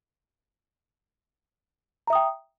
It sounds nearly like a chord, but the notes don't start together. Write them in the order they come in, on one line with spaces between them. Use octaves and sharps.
A#5 E5 D#6 G5